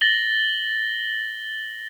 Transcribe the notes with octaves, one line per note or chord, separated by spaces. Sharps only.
A6 A#6 F#7 G7